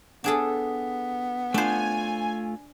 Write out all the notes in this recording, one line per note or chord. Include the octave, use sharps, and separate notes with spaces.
B3 D4 G#4 A4
A3 D4 F4 C5 G#5